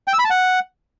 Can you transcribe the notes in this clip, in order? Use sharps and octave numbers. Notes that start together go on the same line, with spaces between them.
G5
E6
B5
A5
F#5